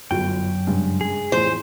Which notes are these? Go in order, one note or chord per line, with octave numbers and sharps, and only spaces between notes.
G1 F#2 F#4 G5
G2 C#3 G#3
G#4
A1 F2 C5